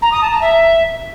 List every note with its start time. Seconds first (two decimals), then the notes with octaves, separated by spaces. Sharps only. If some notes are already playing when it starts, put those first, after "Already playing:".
0.02 A#5
0.12 D#6
0.21 A5
0.31 A#5
0.41 E5